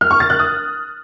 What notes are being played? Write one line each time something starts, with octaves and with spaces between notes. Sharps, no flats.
F6
C#6
A6
F#6
D#6